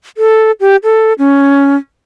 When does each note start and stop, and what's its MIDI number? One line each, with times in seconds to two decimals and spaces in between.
0.17 0.52 69
0.60 0.76 67
0.84 1.13 69
1.19 1.76 61